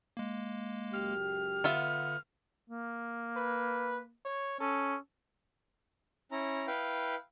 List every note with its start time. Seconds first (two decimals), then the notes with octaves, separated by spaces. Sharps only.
0.17 G#3 A#3
0.93 C#2 F#2 G4 F6
1.64 D3 B3 F4 E5
2.70 A#3
3.37 B4
4.25 C#5
4.60 C#4 A4
6.32 C#4 E4 A#5
6.68 E4 B4 F5 G5